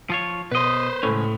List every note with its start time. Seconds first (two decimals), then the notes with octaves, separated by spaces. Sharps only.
0.10 F3 F4 C#5
0.51 B2 B4 C5 D#5
1.03 C#2 A2 C#4